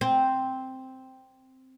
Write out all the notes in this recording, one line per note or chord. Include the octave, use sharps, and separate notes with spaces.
C4